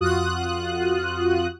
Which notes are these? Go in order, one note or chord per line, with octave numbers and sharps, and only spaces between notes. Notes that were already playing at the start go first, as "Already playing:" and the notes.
F2 F4 F#4 D#6 F#6